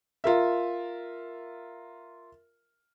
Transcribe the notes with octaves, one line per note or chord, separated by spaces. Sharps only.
F4 A#4 E5